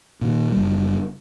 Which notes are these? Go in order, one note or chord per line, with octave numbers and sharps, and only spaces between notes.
A#2 D#3
F#1 G3